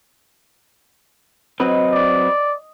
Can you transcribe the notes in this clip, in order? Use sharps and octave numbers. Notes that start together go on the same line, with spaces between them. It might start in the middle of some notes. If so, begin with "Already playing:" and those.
F#3 C4 B4 D#5
D5